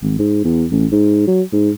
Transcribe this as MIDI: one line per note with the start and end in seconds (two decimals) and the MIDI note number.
0.02 0.18 32
0.19 0.40 44
0.44 0.66 40
0.71 0.86 33
0.92 1.25 44
1.27 1.42 54
1.52 1.70 44